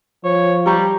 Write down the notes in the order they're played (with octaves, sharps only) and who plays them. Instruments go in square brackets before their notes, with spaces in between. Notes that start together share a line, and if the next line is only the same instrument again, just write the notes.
[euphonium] F3 [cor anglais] C#5
[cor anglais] G3 [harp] G4 A#5 C#6